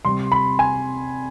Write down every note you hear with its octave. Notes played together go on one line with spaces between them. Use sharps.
C3 G3 C6
B5
G#5